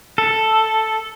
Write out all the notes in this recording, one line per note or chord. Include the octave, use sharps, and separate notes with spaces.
A4